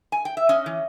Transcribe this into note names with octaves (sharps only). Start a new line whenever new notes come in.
G#5
G5
E5
C#4 D#5
E3